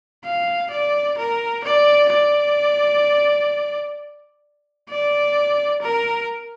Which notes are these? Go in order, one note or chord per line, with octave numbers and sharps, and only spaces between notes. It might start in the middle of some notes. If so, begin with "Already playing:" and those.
F5
D5
A#4
D5
D5
D5
A#4